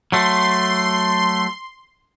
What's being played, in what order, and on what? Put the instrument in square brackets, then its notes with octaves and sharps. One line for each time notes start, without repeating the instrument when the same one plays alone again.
[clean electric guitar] F#3 A3 [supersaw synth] C6